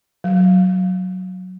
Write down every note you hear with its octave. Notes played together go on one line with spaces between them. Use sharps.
F#3